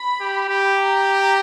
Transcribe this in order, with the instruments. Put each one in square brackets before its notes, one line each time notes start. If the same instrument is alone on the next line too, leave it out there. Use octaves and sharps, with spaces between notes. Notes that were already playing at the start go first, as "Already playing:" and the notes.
Already playing: [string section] B5
[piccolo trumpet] G4
G4
[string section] A#5